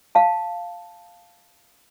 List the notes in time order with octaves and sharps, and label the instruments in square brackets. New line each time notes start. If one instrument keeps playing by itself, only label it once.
[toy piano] F5 A5